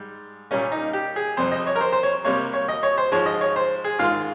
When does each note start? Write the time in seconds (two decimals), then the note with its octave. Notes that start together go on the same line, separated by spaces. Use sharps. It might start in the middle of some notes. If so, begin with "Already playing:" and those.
Already playing: G#2 G3
0.51 A#2 G3 A#3 C#4
0.72 D#4
0.93 G4
1.16 G#4
1.37 F2 C3 G3 C5
1.52 D#5
1.67 C#5
1.76 A#4
1.81 C5
1.92 C5
2.03 C#5
2.24 C3 G3 A#3 C#5
2.53 C#5
2.68 D#5
2.83 C#5
2.97 C5
3.11 G#2 F3 G#3 C#5
3.26 D#5
3.41 C#5
3.56 C5
3.84 G#4
3.99 G#2 D#3 G#3 F4